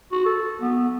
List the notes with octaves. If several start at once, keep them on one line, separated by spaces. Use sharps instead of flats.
F#4
A4
B3